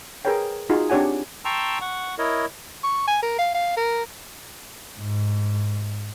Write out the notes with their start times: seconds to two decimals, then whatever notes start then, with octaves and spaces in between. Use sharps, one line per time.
0.25 G#4 A#4 B4 C#5 G5
0.70 D#4 F4 F#4 G#4
0.90 C4 D4 G4 C#5 F#5 G#5
1.45 G5 A5 A#5 C6 C#6 E6
1.81 F#5 C#6
2.18 E4 A#4 C#5 D#5
2.83 C#6
3.08 G#5
3.22 A#4
3.38 F5
3.54 F5
3.77 A#4
4.98 G#2